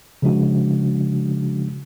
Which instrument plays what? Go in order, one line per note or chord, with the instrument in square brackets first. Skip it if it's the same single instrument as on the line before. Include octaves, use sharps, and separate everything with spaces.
[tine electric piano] C#3 F3 G#3 D4 F#4